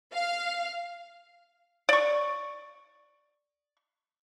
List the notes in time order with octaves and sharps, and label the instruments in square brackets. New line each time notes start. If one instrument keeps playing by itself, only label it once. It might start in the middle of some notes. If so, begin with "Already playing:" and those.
[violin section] F5
[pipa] D5 C#6